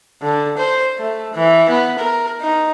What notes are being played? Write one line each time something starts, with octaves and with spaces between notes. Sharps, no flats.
D3
C5
A3
E3
B3
A#4
D#4